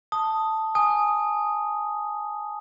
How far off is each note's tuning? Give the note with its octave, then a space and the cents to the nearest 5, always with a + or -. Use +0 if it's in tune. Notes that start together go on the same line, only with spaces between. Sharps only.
A5 +0 D#6 +0
G#5 +0 D#6 +0